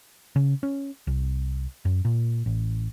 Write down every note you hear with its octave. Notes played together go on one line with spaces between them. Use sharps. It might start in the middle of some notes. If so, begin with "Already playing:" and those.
C#3
C#4
C2
F#2
A#2
A1